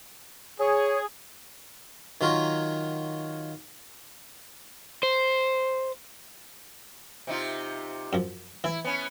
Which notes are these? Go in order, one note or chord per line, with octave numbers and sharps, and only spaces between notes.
G#4 C#5
D#3 F#3 F4 A#4 C#5
C5
C3 D#4 F4
F#2 F3
E3 E4
B3 C#4